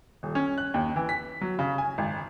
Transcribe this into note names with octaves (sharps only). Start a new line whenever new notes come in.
D#1
C#4
F#6
D#2
E3
B6
F#3
C#3
G#5
G#1